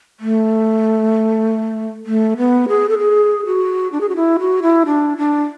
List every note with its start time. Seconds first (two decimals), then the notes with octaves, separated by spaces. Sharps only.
0.20 A3
2.06 A3
2.37 B3
2.69 G#4
2.89 A4
2.99 G#4
3.46 F#4
3.92 D4
4.01 G#4
4.09 F#4
4.16 E4
4.39 F#4
4.62 E4
4.86 D4
5.18 D4